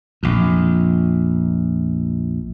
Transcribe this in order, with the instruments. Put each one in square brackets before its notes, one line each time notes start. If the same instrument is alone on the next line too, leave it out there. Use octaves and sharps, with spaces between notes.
[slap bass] A#1 F2